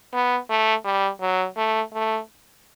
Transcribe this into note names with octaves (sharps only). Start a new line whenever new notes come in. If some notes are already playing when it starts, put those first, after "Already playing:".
B3
A3
G3
F#3
A3
A3